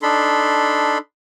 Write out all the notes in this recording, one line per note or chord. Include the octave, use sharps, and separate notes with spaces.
D4 D#4 A4 B5 C6